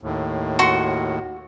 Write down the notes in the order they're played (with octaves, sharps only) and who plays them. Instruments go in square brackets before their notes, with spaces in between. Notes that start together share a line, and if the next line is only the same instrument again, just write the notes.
[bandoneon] D#2 A2
[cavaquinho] F#4 C6 C#6